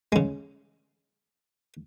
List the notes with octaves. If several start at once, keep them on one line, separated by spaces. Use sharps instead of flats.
C#3 G#3